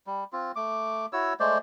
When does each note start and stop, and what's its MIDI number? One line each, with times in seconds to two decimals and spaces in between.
0.07 0.24 55
0.33 0.52 60
0.33 0.52 65
0.56 1.06 57
0.56 1.06 86
1.13 1.33 64
1.13 1.33 66
1.13 1.33 73
1.13 1.33 88
1.40 1.58 56
1.40 1.58 57
1.40 1.58 72
1.40 1.58 74